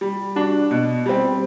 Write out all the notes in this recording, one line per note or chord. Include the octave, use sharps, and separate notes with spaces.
G3
D4 F#4
B2
G3 C4